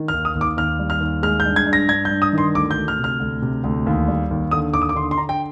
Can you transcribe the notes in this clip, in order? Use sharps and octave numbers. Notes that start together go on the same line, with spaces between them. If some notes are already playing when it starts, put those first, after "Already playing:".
Already playing: D#3
F6
D#2
D#6
D#2
D6
D#2 F6
G3
F6
D#2
G#3 F6
G6
G2
G#6
G2
A#6
G2 G#6
G6
G2
D#6
D#3 C6
D2 D6
G6
D2
F6
C3 F6
D2
C3
D2
D#2
G3
D#2
D3 D#6
D#2 D6
D#6
D6
D3 C6
C6
D3 A#5
G5